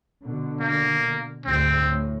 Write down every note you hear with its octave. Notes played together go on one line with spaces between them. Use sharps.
B2 D3
A#3
D2 G#2 C4
A2